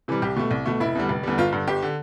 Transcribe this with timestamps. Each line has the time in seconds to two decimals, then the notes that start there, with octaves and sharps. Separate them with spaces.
0.08 C3 E3 G3
0.22 C2 G4
0.36 B2 A3
0.51 C2
0.66 B2 A3
0.80 F1 E4
0.95 E2 D3 G3
1.09 F1
1.23 E2 D3 G3
1.38 G1 F4
1.52 G2 D3
1.68 G1 G4
1.82 D3